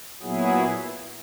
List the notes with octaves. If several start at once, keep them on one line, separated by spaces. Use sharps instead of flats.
A#2 F#3 B3 E4 G#4